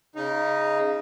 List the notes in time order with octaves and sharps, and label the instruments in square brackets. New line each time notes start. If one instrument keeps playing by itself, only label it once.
[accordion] C#3 D#4